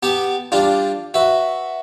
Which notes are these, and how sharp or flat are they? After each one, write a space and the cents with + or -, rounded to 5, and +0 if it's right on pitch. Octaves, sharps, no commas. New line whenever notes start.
B3 +0 G4 +0 A5 +0
G3 +10 D4 +0 F4 +0
F#4 +0 B4 +0 E5 +0